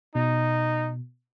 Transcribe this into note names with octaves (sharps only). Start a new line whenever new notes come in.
B2 D#4